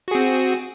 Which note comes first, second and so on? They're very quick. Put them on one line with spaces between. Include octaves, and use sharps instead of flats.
F#4 G#4 C4